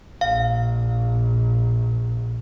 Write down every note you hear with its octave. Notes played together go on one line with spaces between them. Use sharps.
A#1 F5